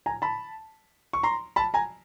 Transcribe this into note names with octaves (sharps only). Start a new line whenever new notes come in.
G#5 A#5
A5 B5
C#6
A#5 C6
A5 B5
G#5 A#5